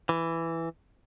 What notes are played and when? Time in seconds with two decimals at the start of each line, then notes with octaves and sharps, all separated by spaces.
0.09 E3